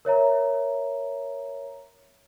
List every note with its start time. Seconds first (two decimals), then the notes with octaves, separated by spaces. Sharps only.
0.05 A#4 C#5 E5 A#5